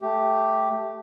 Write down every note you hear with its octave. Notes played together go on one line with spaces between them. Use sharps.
A3 G4